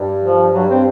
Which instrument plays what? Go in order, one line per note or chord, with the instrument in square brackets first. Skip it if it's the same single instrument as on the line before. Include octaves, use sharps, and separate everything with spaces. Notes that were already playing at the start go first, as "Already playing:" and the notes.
Already playing: [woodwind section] G2
[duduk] F3
F#3
C4